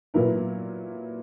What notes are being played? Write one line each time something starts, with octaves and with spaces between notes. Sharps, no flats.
A#2 F#3 B3 E4 A#4